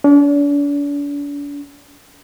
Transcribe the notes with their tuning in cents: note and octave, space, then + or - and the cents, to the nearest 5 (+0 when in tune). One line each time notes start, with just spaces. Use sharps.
D4 -40